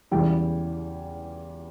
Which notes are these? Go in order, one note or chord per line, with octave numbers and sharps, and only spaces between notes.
E2 C#3 E3 G3 G5